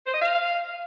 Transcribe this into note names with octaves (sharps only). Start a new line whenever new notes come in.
C5
D#5
F5